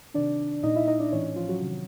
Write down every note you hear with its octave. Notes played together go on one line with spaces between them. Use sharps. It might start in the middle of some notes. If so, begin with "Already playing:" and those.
C3 D#3 D4 D5
A#2 D#4 D#5
E4 E5
D#4 D#5
D4 D5
A2 E3 C#4 C#5
F3 F4
F#3 F#4
C3 D#3